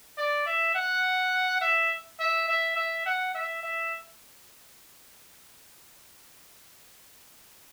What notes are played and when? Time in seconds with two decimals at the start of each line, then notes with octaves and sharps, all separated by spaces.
0.18 D5
0.46 E5
0.75 F#5
1.61 E5
2.19 E5
2.48 E5
2.76 E5
3.06 F#5
3.35 E5
3.63 E5